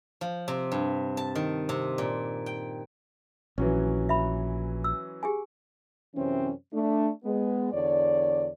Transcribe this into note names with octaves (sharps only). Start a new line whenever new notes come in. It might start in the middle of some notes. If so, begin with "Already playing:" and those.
F3
C3
G2
A5
D#3
C3
A#2
G5
A#1 E3 F#3 C#4
E5 B5
E6
G4 G#4 G#5
F#2 C3 E3 C4 C#4
A3 D4
G#3 B3
E2 D3 C#5 D5